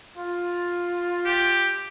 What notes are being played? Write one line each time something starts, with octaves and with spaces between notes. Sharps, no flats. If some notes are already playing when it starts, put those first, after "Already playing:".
F4
G4